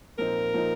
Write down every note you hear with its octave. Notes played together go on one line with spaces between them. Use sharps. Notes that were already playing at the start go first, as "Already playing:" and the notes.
A#2 F3 C4 D#4 A#4
A#2 F3 C4 D#4